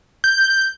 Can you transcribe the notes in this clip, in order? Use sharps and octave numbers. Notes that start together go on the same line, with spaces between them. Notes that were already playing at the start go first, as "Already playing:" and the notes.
G6